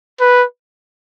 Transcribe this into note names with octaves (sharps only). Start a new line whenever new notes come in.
B4